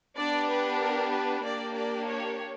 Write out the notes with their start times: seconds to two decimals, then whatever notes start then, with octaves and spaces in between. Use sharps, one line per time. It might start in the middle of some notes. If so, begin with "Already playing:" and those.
0.17 B3 D4 G4 D5
0.49 B4
0.81 A#4
1.12 B4
1.44 A#3 D4 G4 D5
1.75 D5
2.06 C#5